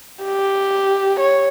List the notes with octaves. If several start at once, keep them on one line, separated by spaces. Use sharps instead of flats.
G4
C#5